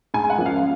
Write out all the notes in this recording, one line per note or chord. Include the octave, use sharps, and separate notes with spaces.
G#2 G#5
F#5
F3 A#3 C#4
F5